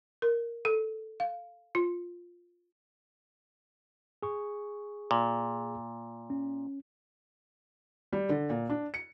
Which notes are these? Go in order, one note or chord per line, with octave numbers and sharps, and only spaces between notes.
A#4
A4
F5
F4
G#4 C#6
A#2
C#4
G3
D3
A#2
D4
C#7